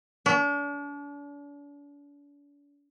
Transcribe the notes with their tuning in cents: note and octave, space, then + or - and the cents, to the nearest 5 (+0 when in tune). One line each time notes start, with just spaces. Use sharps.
D4 -40